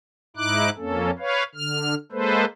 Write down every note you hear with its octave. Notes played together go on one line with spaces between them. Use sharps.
G#2 D#4 E4 D6 F#6
F2 A#3 C#4 A4
B4 C#5 F5
D3 F6
G#3 A#3 A4 B4 C5